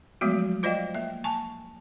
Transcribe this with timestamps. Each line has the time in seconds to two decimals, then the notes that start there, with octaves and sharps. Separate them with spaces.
0.21 F3 F#3 G#3 A3 B3 F#4
0.63 F4 C5 D5 D#5 F5 G5
0.95 A#3 E5
1.24 G#5 A5 C#6